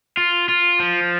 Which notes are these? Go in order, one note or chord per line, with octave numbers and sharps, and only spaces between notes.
F4
F4
F3